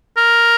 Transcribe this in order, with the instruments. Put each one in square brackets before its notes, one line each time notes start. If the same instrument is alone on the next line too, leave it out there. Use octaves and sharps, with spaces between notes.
[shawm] A#4